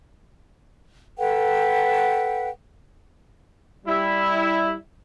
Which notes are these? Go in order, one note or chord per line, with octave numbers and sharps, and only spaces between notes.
A4 B4 F#5 G5
G3 E4